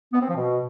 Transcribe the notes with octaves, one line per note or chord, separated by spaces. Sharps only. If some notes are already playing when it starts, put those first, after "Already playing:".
B3
C4
F3
B2